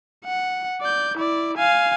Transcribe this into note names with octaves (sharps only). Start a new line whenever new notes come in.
F#5
D5 G6
E4 D5
F5 G#5